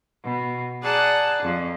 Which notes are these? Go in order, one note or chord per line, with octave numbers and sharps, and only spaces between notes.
B2
G#4 D5 F#5 A5 A#5
F2